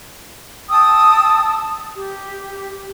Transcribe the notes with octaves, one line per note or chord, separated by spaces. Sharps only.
G5 A5 D#6 E6
G4